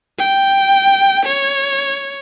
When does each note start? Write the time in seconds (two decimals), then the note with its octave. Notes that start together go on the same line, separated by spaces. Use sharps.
0.19 G5
1.25 C#5